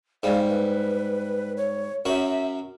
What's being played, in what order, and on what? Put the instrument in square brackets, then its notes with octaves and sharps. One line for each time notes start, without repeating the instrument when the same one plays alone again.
[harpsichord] G#2 G3 [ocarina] F5
[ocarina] B4
C#5
[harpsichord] F#2 F#3 F#4 [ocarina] E5